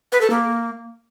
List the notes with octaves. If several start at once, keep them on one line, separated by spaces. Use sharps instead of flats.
B4
A4
A#3